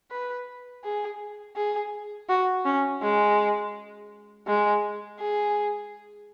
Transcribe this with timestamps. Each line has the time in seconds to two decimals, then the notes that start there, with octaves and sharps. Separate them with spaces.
0.11 B4
0.84 G#4
1.56 G#4
2.29 F#4
2.65 C#4
3.02 G#3
4.47 G#3
5.19 G#4